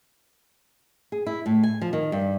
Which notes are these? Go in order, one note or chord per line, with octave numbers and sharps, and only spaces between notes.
G#4
E4
A2
G#5
F3
D#3
G2